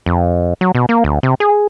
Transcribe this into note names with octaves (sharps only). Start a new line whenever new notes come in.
F2
F#3
B2
A#3
D2
C3
G#4